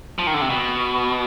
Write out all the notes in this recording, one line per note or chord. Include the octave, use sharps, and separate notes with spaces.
F3
D#3
D3
C3
B2